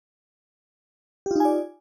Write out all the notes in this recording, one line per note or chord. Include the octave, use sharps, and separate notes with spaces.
D#4 F4 G4 D5 G#5